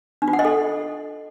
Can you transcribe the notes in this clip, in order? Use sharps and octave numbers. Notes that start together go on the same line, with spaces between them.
D4
F4
F#5
D#5
A4